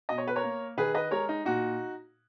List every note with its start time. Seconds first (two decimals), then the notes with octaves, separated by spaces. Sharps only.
0.09 B2 D#5
0.18 C#5
0.28 B4
0.36 A#4 C#5
0.43 A#3
0.77 D#3 G#4 B4
0.95 B4 D#5
1.11 G#3 A#4 C#5
1.29 D#4
1.45 A#2 D#4 F#4